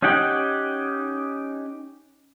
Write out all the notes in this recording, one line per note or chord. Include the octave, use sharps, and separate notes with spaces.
C#4 D#4 G4 F#5 G5